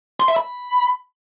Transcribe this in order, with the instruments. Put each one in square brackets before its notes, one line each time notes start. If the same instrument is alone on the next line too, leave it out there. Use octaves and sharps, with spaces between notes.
[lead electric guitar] C6
E5
B5